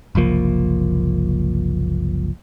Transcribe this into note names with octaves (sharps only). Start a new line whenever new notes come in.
F#1 C2 F3 A#3